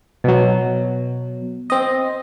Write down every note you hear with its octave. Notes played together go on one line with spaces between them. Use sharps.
B2 F#3
C4 D#5